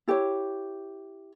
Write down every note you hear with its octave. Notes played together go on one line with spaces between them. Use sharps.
E4 G4 C#5